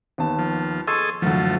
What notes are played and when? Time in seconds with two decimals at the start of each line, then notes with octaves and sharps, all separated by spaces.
0.18 D#2 B3 A5
0.39 F3
0.87 G#4 A4 D#5 C6 C#6 E6
1.22 F#1 D2 F3 A3